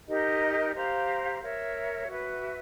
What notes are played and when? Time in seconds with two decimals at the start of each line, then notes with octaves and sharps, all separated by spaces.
0.08 D#4 G4 A#4 D#5
0.74 G4 C5 F5 A#5
1.42 A#4 C#5 E5
2.09 F#4 B4 E5